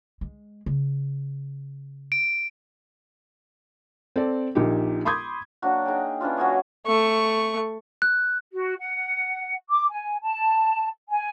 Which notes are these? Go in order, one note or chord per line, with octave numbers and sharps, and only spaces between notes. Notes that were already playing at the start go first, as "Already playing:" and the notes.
G#3
C#3
D7
C4 A4 D5
A#1 A#2 D#4 G4
B5 C6 D6 D#6 G6 G#6
F#3 A#3 D4 F#4
D#4 G#4 G5
E3 C#4 D4 F4
F#3 F#4 C#5 D#5
A3 C#6
F#6
F#4
F#5
D6
G#5
A5
G#5